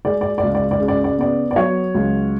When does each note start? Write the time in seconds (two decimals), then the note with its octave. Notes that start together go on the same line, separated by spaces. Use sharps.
0.05 G#3 D5
0.21 D5
0.38 D5
0.43 C#2
0.55 D5
0.71 D5
0.80 C#3
0.88 D5
1.04 D5
1.18 B3 D5
1.51 D5
1.56 F#3 C#5
1.94 C#2